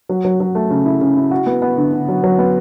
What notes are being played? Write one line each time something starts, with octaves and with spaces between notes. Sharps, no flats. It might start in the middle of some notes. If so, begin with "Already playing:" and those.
F#3
F#3
F#3
A3
C#3
E4
C#3
E4
F#4
B3
B3
D3
D3
F#3
F#3
B3